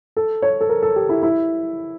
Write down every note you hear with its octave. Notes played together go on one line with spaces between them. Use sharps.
A4
C#5
A4
A#4
A4
G4
E4
E4